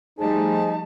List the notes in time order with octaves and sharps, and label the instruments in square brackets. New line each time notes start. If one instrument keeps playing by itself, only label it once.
[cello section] F3 G3 A3 [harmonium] D#4 [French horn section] G#4 C5 [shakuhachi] A5